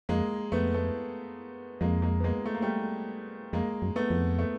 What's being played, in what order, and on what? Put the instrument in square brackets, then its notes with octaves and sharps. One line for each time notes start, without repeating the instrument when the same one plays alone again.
[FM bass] F2 [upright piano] G#3 A#3
[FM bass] F2 [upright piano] A3 B3
[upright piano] A3 B3
[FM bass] F2 [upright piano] G#3 A#3
[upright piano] G#3 A#3
B3
G#3 A#3
A3
A#3
G3 A3
[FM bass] F2 [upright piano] G#3 A#3
[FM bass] F#2
[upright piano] A3 B3
[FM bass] F2
[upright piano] A3 B3